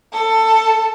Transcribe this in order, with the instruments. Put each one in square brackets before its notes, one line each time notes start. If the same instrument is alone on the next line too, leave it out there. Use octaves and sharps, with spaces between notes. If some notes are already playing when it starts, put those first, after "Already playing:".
[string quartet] A4